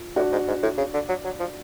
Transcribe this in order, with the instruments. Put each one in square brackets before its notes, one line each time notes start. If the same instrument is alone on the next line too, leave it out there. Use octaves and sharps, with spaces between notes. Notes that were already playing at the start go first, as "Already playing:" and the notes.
Already playing: [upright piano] F4
[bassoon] A2 [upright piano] D4 F#4
[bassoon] G#2
G#2
A2
C#3
D3
F#3
F#3
F3